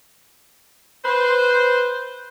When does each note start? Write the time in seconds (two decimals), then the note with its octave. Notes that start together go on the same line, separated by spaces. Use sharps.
1.05 B4 C5